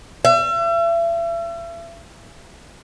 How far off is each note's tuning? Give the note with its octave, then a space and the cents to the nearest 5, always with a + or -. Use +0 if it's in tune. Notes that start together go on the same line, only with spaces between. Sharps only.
E5 +40